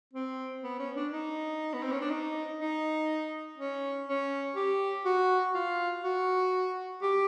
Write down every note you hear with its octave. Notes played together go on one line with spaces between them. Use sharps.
C4
B3
C#4
D4
D#4
B3
C4
C#4
D4
D#4
D#4
C#4
C#4
G4
F#4
F4
F#4
G4